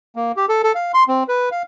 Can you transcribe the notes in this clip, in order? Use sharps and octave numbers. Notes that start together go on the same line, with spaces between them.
A#3
G4
A4
A4
F5
C6
C4
B4
F5